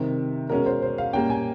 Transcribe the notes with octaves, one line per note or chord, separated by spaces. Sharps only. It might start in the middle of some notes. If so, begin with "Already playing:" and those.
Already playing: C3 D#3 G3 C4 A#4
B2 G#3 C#4 A#4
C5
C5
F5
A#2 G3 A#3 C#4 G5
G#5